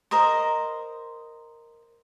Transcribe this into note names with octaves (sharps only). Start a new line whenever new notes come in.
A#4 C5 D#5 C6